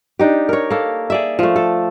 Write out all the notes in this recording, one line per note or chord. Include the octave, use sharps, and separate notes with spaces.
D4 D#4 G4
A#4 C#5
A#3 A4
G#4 D5 E5
F3 A3
A4